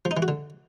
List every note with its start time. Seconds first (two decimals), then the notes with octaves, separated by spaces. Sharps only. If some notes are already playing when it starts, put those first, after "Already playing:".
0.05 F3
0.11 D#4
0.17 E3
0.22 F#4
0.28 D3